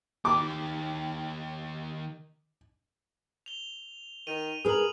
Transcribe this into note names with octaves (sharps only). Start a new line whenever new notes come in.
D#3 G4 D6
F7 G7
D#3 D#7 F7
G#4 A#4 B4 D#6 F#7